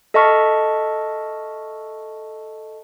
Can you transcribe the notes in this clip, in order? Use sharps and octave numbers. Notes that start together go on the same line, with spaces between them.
A4 D#5 E5 A5 C#6 F6